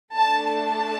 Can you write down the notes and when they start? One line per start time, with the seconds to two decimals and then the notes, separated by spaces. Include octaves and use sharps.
0.16 A3 D4 A4 A5
0.48 A5